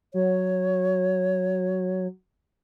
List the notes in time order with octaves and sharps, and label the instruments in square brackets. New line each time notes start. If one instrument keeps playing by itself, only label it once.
[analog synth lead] F#3 [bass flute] C#5